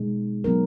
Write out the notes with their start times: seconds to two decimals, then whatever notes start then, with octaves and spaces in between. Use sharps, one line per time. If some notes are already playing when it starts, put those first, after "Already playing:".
Already playing: B2 G#3 D#4
0.44 F#3 B3 D#4 A#4